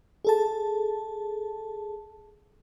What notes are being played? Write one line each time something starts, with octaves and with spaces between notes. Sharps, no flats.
G#4 A4 A5